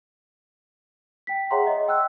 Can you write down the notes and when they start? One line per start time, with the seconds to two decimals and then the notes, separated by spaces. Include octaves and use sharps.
1.27 G5 B6
1.51 G#4 C#5 E5 F#5 A#5 C6
1.67 D#5
1.88 G5 E6 F#6